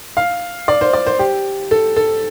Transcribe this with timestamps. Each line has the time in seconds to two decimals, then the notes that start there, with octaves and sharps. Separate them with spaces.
0.17 F5
0.68 D5
0.81 C5
0.93 D5
1.06 C5
1.19 G4
1.71 A4
1.96 A4